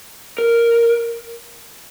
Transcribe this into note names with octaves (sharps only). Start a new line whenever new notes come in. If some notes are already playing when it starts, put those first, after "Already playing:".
A#4